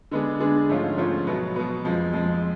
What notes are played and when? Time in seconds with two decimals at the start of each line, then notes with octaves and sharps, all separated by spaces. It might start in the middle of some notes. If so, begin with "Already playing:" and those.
0.11 D3 G#3 B3 D4 G#4
0.40 D3 G#3 B3 D4 G#4
0.69 G#2 F3 A3 C#4 F4
0.97 G#2 F3 A3 C#4 F4
1.27 B2 F#3 B3
1.56 B2 F#3 B3
1.84 F2 F3 G#3
2.13 F2 F3 G#3